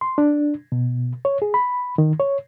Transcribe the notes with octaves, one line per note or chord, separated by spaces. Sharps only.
C6
D4
B2
C#5
G#4
B5
D#3
C#5